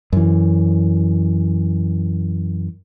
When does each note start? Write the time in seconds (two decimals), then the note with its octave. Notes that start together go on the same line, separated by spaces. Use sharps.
0.13 F#2 E3